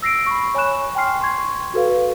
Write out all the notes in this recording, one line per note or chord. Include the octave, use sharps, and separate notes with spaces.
E6 A#6 C7 D7
B5 C#6
C#5 G#5 B5 C#6 F#6 E7
G5 G#5 C6 F6 C7
C6 C#6 G#6
F#4 A4 B4 F5